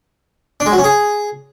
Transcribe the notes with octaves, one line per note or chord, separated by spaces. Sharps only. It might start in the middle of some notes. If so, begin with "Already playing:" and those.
D4
G#3
F#3
C#4
G#4